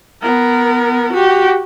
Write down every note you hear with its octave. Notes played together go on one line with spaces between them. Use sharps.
B3 A#4
F#4 G4